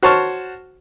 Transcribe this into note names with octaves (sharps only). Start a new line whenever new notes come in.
F#4 C5 C#5 A5 C#6 F6